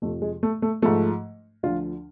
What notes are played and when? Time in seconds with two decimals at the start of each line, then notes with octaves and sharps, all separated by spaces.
0.02 F2 C3 F3 A3
0.22 G#3
0.43 A3
0.62 A3
0.82 G#2 F3 A3
1.63 D2 D3 F3 F4